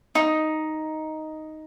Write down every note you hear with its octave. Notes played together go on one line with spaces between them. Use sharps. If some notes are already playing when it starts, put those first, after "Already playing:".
D#4